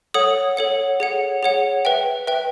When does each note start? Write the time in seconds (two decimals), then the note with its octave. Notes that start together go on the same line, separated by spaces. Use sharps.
0.14 A4 C#5 F#5 D#6
0.57 A4 C#5 F#5
1.00 G#4 C#5 F#5
1.43 G#4 C#5 F#5
1.85 B4 E5 G5
2.27 B4 E5 G5